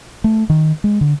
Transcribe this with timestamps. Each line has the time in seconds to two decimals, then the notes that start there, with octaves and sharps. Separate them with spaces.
0.24 A3
0.50 D#3
0.84 G#3
1.01 D3